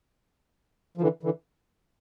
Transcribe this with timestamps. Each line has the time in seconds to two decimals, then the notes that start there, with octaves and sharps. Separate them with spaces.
0.97 F3
1.01 D3 E3
1.23 D3 E3